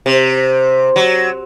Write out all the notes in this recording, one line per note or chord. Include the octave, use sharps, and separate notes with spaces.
C3
F#3